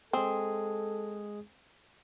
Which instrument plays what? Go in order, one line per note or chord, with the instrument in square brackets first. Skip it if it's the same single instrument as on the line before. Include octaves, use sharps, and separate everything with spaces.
[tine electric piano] G#3 G#4 [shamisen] C4 [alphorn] A4